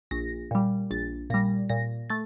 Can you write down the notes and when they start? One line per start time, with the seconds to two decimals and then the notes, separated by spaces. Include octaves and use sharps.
0.11 A#1 A#6
0.51 A#2 G3
0.91 A#1 A6
1.30 A#2 G3 A#6
1.69 A#2 A#6
2.10 A3 A6